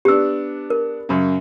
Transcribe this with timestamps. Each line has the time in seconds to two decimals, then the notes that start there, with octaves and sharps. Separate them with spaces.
0.05 B3 D4 G4 E6
0.70 A#4
1.09 F#2 C#3